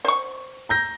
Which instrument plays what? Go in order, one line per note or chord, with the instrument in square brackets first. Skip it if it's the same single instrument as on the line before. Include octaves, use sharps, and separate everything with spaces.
[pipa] C5 C#6
[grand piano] A#5 G6 A#6